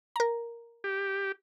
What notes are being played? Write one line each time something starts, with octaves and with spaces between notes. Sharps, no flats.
A#4 A#5
G4